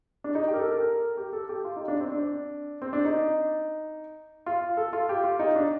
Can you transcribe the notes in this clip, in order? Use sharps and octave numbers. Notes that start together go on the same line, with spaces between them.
D4
D#4
G4
A#4
A4
A#4
G4
A4
G4
F4
D#4
D4
C4
D4
C4
D4
D#4
F4
A4
F4
G4
F4
D#4
D4